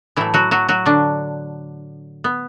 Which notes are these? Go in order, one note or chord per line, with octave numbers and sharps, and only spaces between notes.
A2 E3 F#3 A3 E4
F#3 F#4
F#3 F#4
F#3 F#4
D3 D4
B3